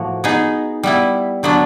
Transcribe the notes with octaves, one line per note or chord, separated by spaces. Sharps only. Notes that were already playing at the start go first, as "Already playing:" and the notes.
Already playing: A2 F3 A#3 F#4
B3 D#4 G#4
G3 B3 E4
D3 F#3 B3 D4